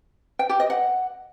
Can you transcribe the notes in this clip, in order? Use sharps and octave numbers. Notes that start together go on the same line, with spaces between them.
G5
G4
D#5
F#5